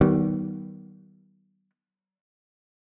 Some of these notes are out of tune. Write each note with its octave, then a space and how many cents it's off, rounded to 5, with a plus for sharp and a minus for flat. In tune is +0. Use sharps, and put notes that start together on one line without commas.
D#3 +5 G3 -40 B3 +0